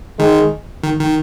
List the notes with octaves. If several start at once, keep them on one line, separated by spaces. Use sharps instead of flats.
D#3 G#3
D#3
D#3